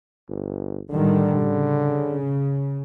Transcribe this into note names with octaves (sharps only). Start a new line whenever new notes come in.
G1
A2 D3 D#3 G3
C#3